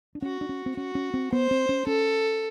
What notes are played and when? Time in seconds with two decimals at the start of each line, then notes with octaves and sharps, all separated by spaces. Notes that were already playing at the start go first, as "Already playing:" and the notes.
0.15 D4
0.22 C#4 F#4
0.41 D4
0.49 C#4
0.66 C4
0.77 C#4 F#4
0.95 C#4
1.14 C4
1.32 B3 C5
1.51 C4
1.69 C#4
1.87 C#4 A4